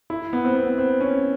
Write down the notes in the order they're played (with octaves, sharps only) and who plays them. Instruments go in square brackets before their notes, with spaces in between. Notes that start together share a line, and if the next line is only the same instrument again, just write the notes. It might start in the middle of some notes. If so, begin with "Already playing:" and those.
[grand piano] E4
B3
C4
B3
C4
C#4